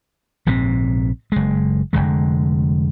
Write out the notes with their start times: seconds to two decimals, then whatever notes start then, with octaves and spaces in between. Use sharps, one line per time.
0.46 A#1 G#2 C3 C4
1.32 F#1 G#3
1.93 F1 E2 D3 G#3